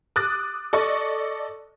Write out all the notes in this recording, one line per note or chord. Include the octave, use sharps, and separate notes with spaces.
D6 D#6 F#6 A6
A4 D5 D#5 C#6